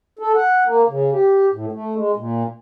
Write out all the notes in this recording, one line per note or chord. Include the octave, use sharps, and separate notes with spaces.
A4
F#5
A#3
C#3
G4
A2
A3
G#3
A#2